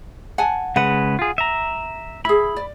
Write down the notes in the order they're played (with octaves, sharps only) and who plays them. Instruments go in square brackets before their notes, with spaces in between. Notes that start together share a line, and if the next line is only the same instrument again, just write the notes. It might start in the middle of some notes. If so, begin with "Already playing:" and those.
[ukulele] F#5 G#5 A5
[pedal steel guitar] C#3 G#3 B4 [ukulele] F#5
[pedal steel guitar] F4 G#4
E5 A#5
[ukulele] E4 G#4 [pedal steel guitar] B5
[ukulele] D5